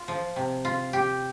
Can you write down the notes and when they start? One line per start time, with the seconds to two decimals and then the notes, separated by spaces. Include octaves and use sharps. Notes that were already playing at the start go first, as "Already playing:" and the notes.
Already playing: F4
0.08 F3
0.36 C3
0.65 F4
0.93 G4